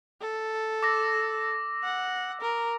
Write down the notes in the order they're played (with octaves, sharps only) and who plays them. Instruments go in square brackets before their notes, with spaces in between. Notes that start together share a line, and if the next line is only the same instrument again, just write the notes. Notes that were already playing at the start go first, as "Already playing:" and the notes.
[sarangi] A4
[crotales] D6 E6 A#6
[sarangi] F#5
A#4